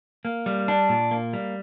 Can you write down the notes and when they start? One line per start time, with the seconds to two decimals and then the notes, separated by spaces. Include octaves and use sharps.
0.25 A#3
0.46 G3
0.68 D4
0.89 A#2
1.11 A#3
1.33 G3